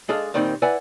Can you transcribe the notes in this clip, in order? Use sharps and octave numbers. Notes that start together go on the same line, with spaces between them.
G#3 D4 G#4 A4 D#5 F5
A#2 D#3 G3 C4 D#4
E4 B4 D5 E5 F#5 G#5